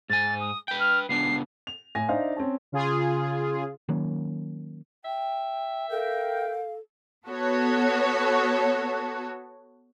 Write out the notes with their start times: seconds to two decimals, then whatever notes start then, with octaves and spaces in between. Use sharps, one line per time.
0.10 G#2 G#5 A6
0.41 D#6
0.68 B4 G5 G6
0.80 F6
1.09 C#2 B3 D4 C7
1.67 F7
1.95 A2 G#5 A#6
2.09 D4 D#4 C5 E5 F5
2.36 C4 C#4 A5
2.72 C#3 F4 G#4
3.89 D#3 F#3 A#3 C#4
5.05 E5 G5
5.91 A4 A#4 F5 G5
7.26 B3 F#4 A4 C#5